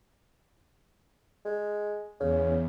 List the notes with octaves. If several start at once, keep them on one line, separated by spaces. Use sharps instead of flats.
G#3
E2 C#3